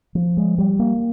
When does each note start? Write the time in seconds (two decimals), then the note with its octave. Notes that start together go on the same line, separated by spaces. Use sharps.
0.15 F3
0.37 G#3
0.58 G3
0.79 A#3